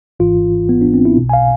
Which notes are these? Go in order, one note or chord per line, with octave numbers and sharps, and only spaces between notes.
G#1 G#2 E3 F4
B3
D4
C4
E4
B1 B2
G#5
F5